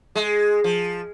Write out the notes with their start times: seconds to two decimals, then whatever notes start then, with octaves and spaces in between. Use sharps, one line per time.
0.15 G#3
0.64 F3